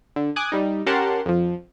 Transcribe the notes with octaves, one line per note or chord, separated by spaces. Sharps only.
D3
G#5 D6 D#6 F#6 G#6
G3 D#4
C#4 G4 A#4 F#5 A5 C6
F2 F3